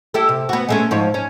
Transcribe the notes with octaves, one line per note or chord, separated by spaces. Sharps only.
E4 G4 A4
C3
B3 F#4
G#3 A3 C#4
G#2 F3 C#5
C#4